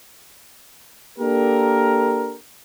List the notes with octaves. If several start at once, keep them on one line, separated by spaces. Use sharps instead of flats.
A#3 D4 G4 A4 A#4